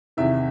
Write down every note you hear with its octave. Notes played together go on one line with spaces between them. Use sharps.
E2 C3 D#3 E5